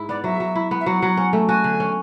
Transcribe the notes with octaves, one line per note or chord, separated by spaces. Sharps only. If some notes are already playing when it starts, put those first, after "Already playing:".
Already playing: G#2 E4
B3 D5
F#3 E5
F#3
E4
B3
E5
F#3 F#5
F#3
C#4
A3
F#4 G#5
D3
C#4